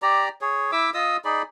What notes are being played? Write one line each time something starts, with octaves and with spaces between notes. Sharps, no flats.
G4 D5 A#5
G#4 C#5
E4 E5 D6 E6
F4 D#5 D#6 E6
D#4 G#4 D5 B5